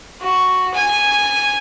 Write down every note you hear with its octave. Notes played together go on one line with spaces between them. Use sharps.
F#4
G#5